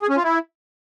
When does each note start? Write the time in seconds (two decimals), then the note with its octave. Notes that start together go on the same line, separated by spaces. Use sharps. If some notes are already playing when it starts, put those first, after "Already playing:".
0.02 G#4
0.09 C#4
0.17 F4
0.24 E4